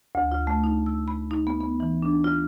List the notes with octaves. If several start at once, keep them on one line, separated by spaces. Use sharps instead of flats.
D2
F4
A3
D#4
E6
B5
D#4
B3
B3
E3
D4
F4